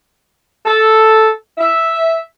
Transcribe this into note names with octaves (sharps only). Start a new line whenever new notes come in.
A4
E5